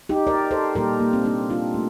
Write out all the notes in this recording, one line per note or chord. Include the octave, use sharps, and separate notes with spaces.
D#4 G4
A#4 D5
A4 C5
A#2 G3 A#3 G4 A#4
A#3
C4
A#3 D4
D4 F4
A3